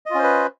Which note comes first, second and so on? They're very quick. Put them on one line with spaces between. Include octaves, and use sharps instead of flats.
D#5 F4 C#4 C5 B4